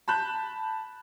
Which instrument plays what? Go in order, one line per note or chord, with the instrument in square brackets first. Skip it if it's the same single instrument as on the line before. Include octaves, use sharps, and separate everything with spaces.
[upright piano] A5 B5 F#6 G6